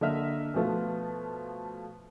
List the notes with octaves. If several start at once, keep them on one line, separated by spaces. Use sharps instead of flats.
D3 A#3 D#5 E5 F6
B2 F3 A3 B3 F4